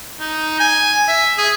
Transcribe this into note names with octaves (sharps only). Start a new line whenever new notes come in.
D#4
G#5
E5
G#4